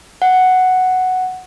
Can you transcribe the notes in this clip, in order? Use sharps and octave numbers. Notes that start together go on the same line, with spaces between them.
F#5